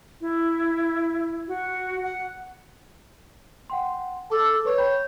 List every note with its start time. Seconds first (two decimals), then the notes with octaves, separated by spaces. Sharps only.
0.21 E4
1.48 F#4
2.03 F#5
3.70 F#5 G5 C6
4.30 A4 A5 D6 E6
4.65 B4 C#5 C#6
4.78 G5 B5 G6